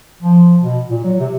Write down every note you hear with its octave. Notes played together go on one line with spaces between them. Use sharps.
F3
B2
A#2
F#3
C3